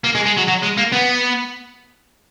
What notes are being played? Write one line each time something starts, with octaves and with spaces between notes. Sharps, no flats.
A#3
G#3
G#3
F#3
F#3
G#3
A#3
B3